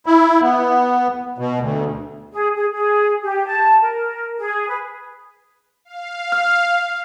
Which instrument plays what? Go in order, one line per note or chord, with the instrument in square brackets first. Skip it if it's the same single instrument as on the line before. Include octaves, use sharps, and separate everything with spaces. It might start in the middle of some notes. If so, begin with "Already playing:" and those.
[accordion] E4
B3
B2
D2
[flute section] G#4
G#4
G#4
G4
A5
A#4
G#4
B4
[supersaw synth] F5
[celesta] F6